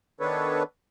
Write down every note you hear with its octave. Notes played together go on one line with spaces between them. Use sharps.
D#3 B3 D4 A4 B4 C#5